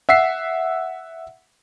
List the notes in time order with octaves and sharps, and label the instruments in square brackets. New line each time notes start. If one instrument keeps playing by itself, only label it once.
[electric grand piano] E5 F#5 E6 B6 C7